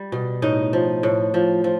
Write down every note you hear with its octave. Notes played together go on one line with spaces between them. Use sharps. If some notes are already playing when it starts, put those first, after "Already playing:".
Already playing: G3
B2
A2 D#4
F3
A2
F3
F3